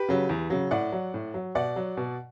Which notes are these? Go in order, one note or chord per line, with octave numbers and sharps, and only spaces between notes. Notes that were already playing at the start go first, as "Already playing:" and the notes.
Already playing: G4 B4
C#3 F#3
E2
C#3 F#3
A2 D5 F#5
F#3
A2
F#3
B2 D5 F#5
F#3
B2